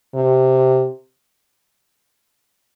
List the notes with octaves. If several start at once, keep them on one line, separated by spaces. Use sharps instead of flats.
C3